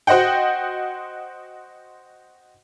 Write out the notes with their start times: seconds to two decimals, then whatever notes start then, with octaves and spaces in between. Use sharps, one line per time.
0.07 F#4 C5 D#5 F#5 G5